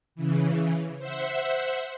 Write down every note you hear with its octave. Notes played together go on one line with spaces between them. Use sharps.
C#3 E3
C5 E5 F#5